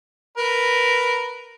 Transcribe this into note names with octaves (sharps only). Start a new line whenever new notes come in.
A#4 B4